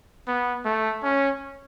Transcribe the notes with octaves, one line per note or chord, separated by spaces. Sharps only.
B3
A3
C#4